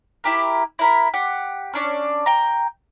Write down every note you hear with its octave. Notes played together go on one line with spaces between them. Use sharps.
E4 G4 A#4
E4 A#4 B5
G4 F#5
C#4 D4 D5
G5 A#5